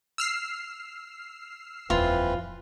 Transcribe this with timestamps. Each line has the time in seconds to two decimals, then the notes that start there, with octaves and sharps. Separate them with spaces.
0.18 E6 F6 C7
1.90 D#1 F2 E3 C4 F4 B4